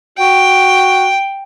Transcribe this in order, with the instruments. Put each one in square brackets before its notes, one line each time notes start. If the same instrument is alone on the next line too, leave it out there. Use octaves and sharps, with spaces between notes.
[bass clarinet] F#4 [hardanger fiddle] G5